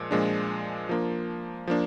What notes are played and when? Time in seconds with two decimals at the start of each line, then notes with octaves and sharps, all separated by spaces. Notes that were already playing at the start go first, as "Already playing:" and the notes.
Already playing: A#2 F3 G#3
0.11 A#2 F3 G#3 D4
0.89 F3 A#3 D4
1.67 F3 A#3 D4